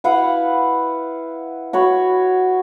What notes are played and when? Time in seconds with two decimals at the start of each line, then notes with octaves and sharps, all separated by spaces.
0.04 E4 B4 F5 F#5
1.73 F#4 C#5 B5